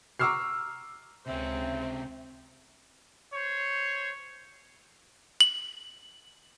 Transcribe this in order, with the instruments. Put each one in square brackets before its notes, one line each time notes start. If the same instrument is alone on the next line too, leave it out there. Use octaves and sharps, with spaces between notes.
[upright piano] A#5 C#6 D6 E6 F6 C7
[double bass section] C#2 [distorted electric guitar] C3 C#4 [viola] C4 [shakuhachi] E5
[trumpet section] C5 C#5
[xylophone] F#7